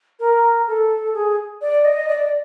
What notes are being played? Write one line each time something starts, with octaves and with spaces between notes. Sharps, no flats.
A#4
A4
G#4
D5
D#5
D5